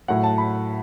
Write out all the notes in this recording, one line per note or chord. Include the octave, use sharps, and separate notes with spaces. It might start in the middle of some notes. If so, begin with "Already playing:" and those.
A2 F#3 F#5
A5
B5